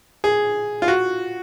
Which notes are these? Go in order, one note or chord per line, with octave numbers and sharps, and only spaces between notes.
G#4
F4
F#4